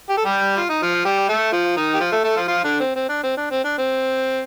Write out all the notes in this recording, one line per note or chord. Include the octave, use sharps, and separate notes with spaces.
G4
A4
G3 G4
F4
D#4
F3 F4
G3 G4
A3 A4
F3 F4
D#3 D#4
G4
F3 F4
A3 A4
A3 A4
F3 F4
F3 F4
D3 D4
C4
C4
D4
C4
D4
C4
D4
C4